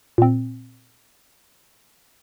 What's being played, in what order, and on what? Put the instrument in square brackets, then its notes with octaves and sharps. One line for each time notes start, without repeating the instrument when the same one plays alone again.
[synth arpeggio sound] A#2 C4